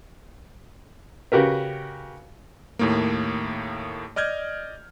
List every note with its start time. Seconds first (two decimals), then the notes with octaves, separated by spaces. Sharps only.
1.32 C#3 F#4 G4 A#4 B4
2.79 D#2 A2 A#3
4.16 D5 D#5 F6 G6 G#6